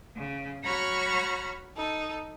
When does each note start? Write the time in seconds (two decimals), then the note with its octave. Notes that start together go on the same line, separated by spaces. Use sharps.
0.16 C#3
0.63 F#4 C#5 A#5 B5 C#6 F6
1.76 D#4 A4